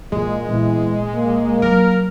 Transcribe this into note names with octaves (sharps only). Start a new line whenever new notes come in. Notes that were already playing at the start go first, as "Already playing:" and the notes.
A#2 E3 G#3
A#2 E3 B3
A#3
F#3 A#4